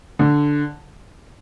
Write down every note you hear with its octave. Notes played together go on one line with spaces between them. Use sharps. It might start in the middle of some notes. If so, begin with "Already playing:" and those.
D3